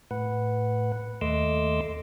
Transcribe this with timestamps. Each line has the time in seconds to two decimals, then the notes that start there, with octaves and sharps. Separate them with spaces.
0.11 A2 B4 F#5
1.21 D#2 A3 D#5 C6 D6 E6